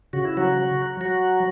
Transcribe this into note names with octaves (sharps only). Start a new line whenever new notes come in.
C#3 F#4
E4
F#3 F#4
F#3
F#3 F#4